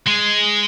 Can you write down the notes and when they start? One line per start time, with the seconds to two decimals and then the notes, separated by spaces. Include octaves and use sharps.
0.06 G#3